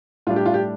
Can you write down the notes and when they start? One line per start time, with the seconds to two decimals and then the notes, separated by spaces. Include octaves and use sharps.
0.27 A2 G3 D4 F4
0.36 G4
0.46 F4
0.54 G4